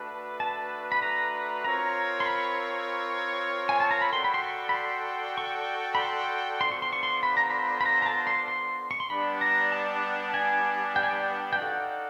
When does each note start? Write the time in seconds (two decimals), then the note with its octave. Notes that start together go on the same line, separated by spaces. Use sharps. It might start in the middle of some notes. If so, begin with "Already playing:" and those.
Already playing: A3 D4 F#4 B4 A5
0.40 A5
0.92 B5
1.02 A#5
1.64 C4 F4 A#4 C#5 A#5
2.20 C6
2.26 B5
3.69 G#5
3.80 A5
3.91 A#5
4.01 B5
4.12 F#4 A4 D5 G5 C6
4.24 B5
4.34 C6
4.44 C#6
4.69 B5
4.74 C6
5.38 C#6
5.95 B5
5.99 C6
6.61 B3 D4 F4 A4 C5 C6
6.72 C#6
6.82 C6
6.93 C#6
7.03 C6
7.23 B5
7.37 A#5
7.50 B5
7.81 B5
7.86 A#5
8.02 A#5
8.06 A5
8.27 C6
8.48 C6
8.91 C#6
9.00 C6
9.09 G3 B3 D4 G4 B5
9.41 A#5
9.72 A5
10.34 G#5
10.96 G5
11.03 G#5
11.10 G5
11.53 G5
11.58 D#4 F#4 A4 D5 F5 F#5